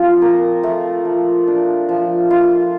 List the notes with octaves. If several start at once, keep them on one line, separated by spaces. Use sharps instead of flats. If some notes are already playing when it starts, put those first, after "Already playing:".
Already playing: F3 C4 F4
A#4
A3
F3
D4
F3
F4